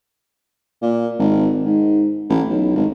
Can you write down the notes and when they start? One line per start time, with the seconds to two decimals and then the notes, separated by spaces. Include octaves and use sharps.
0.82 A#2
1.19 G#1
1.65 G#2
2.30 A1
2.49 B1
2.76 G#1